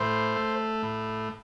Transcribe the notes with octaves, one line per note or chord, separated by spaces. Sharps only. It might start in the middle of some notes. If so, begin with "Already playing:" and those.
Already playing: A2 C5
A3
A2